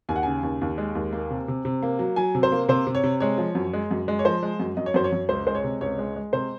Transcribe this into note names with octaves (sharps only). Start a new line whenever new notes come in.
D#2 G#5
F#5
C#3 G#5
D#2
D#2
G#3
D#2
A#3
C3
C3
C3
A#3
F#3
F#3 G#5
C3
C5
A#3
C3 C5
C3
C#5
C3
G#3 C#5
F3
F#2
G#3
F#2
G#3
C#5
F3 C5
G#3
F#2
F#2 D#5
C#5
F#2 C5
C#5
F#2
C#2 C5
G#3 C5
C#5
C3
C#2 C#5
G#3
G#3
C3 C5